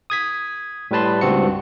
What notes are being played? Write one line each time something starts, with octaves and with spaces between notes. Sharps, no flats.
D#6 G#6 B6
A2 G3 B4 A5 C6
C#2 G2 C4 F#4 C#7